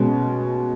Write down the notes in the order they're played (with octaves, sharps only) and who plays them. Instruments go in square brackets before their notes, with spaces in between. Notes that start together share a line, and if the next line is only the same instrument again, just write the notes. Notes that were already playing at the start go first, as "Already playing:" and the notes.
Already playing: [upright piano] B2 G#3 C#4